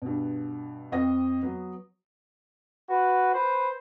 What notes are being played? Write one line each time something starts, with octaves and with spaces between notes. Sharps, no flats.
G2 B2
F2 C4 D#5 D#6 A#6
F#3 B3
F#4 B4
B4 C5